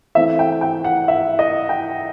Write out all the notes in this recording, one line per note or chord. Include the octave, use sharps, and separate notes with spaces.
E3 A3 C4 E5
G5
G5
F#5
E5
D#5
G5